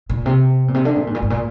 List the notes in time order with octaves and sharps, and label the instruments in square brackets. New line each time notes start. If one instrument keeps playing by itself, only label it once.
[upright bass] A#2
C3
A#2
C3
D3
A#2
G#2
A#2
G#2
A#2